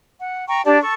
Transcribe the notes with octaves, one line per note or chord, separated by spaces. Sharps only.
F#5
G5 A#5 C#6
D4 G4 D5 A5
A4 C#6